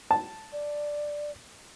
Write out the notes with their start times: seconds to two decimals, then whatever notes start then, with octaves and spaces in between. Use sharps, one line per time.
0.11 A5
0.52 D5